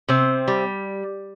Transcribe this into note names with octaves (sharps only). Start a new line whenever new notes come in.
C3 C4
G3